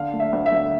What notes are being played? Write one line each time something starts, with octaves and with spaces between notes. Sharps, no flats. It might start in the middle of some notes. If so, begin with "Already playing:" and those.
Already playing: D3 F5
A3
E5
D2
E5
D2